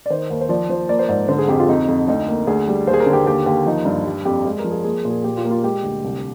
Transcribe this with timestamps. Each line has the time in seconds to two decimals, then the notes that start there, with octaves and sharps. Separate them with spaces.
0.06 D5
0.10 D#3 C5
0.30 D#2 A#4
0.41 C5
0.49 F3 D5
0.69 F3 C5
0.89 A#3 D5
0.99 C5
1.08 G#2 D5
1.28 D3 C5
1.39 G#4
1.48 F2 G4
1.59 F4
1.69 F2 D#4
1.88 F2
2.08 D2 D#4
2.28 A#3
2.47 D2 G#4
2.68 G3
2.87 D#2 C5
2.94 G#4
3.00 A#4
3.06 D3 G#4
3.13 G4
3.26 D#2 G4
3.46 D#2 G4
3.66 F3 D#4
3.85 G2
4.06 G3
4.25 F2 G4
4.45 G#3 G#4
4.59 A#4
4.64 F3
4.71 G#4
4.84 A#3 G#4
5.05 A#2
5.11 G#4
5.24 A#2 G4
5.37 F4
5.45 A#3
5.51 F4
5.63 G#3 G4
5.84 D2
6.04 C2